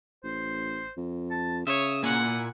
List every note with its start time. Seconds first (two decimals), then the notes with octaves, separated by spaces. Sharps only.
0.24 A1 C5
0.97 F2
1.31 A5
1.67 C#3 C#5 E5 D#6
2.03 A#2 A#3 E4 F#5 G#5